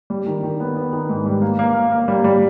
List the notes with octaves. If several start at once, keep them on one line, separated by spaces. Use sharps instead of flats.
G3
D#3
D#3
B3
B3
D#3
G#2
G3
A#3
A#3
A#3
A#3
G3
G3